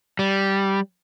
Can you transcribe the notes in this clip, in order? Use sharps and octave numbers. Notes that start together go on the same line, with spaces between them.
G3